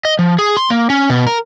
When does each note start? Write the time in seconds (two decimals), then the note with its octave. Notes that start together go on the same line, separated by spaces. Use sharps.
0.05 D#5
0.19 F3
0.39 G#4
0.57 C6
0.70 A#3
0.90 C#4
1.10 B2
1.27 A#4